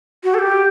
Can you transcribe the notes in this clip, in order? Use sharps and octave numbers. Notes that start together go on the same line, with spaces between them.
F#4
A4
G4